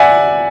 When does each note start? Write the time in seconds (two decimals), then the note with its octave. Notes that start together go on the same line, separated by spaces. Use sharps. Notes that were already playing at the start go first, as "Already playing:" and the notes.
Already playing: D5 E5 F#5 G#5